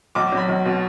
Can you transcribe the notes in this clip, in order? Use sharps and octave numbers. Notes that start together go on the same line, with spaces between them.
B1 D6
D6
F#3
B5
B1
B2